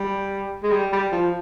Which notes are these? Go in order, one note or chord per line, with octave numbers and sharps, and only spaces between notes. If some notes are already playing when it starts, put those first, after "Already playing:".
Already playing: G3
G#3
G3
G3
F3